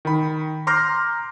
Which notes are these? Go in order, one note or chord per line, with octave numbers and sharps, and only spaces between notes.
D#3 B5
A#5 C6 D6 F6 G6 A#6